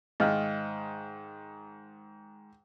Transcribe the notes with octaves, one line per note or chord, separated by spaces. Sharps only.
G#2 D#3 D#5 F5 F6